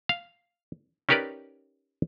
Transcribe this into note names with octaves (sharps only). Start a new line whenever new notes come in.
F5
C#4 D#4 G4 A#4 B4 D5